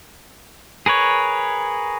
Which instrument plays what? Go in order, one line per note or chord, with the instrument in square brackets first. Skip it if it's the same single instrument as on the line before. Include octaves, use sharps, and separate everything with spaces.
[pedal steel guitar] G#4 A#4 B4 C#5